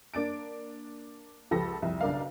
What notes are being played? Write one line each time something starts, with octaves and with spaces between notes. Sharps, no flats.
A#3 D4 A6 D7
C#2 F3 G4 A4 B5 A#6
C2 F2
B1 C#3 D4 A#4 D#5 F5